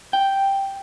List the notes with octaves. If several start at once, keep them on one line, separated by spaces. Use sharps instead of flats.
G5